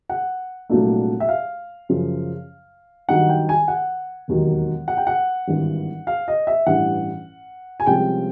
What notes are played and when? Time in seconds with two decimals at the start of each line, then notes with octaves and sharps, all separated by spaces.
0.10 F#5
0.69 C2 A#2 F#3 A3 D4
1.20 E5
1.29 F5
1.89 F#2 C#3 F3
3.09 G2 D#3 F#3 F#5
3.29 G5
3.49 G#5
3.68 F#5
4.28 E1 D#2 D#3 F#3
4.88 F#5
4.97 G5
5.07 F#5
5.48 G#1 G2 E3
6.07 F5
6.28 D#5
6.47 E5
6.67 A1 G2 E3 F#5
7.80 G#5
7.86 C2 C3 F3 G#3 C#4 G5